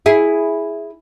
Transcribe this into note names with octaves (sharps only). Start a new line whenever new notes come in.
E4 G#4